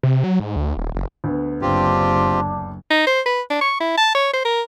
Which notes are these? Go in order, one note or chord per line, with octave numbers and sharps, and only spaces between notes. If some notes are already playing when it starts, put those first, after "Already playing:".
C3
F#3
G#2
D2
D#1
F#1
D2 B3
F#1 C4 D4 F4 G4
D#4
C5
B4
D4
C#6
E4
A5
C#5
C5
A#4